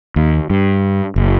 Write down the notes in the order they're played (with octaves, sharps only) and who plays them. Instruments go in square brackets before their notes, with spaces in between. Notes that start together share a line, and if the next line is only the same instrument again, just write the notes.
[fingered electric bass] D#2
G2
F#1